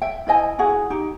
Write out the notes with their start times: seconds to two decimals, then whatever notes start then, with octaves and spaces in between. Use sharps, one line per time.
0.02 E5 G5
0.27 E4 C5 D#5 G#5
0.58 E4 F#4 G#4 F#5
0.90 D#4 G4